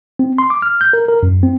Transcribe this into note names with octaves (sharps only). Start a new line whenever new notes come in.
C4
C6
D6
F6
G6
A#4
A#4
F#2
C4